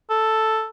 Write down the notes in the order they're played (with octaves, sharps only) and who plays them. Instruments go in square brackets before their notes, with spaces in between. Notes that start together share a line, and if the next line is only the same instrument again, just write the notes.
[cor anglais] A4